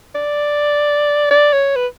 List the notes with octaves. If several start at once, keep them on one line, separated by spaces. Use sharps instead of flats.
D5
D5
C#5
B4